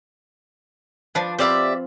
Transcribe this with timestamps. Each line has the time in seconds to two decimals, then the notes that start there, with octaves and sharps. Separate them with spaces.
1.15 F3 D4 B4
1.39 C4 G4 D5 E5 F5 B5